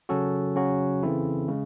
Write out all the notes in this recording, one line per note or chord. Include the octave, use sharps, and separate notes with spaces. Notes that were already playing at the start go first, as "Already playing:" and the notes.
C#3 F#3 C#4 F#4 A4
C#3 F#3 C#4 F#4
C#3 E3 C4 E4 A4
C#3 G#3